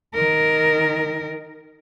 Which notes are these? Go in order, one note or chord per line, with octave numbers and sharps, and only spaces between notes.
D#3 A#4